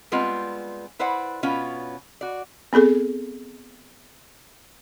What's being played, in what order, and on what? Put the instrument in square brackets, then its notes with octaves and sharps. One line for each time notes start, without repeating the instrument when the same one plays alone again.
[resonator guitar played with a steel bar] G3 G#3 B3 C4 F4
E4 B4 C5 D5 F#5
B2 B3 C#4 F4
F#4 D5
[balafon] B3 C4 G#4 A4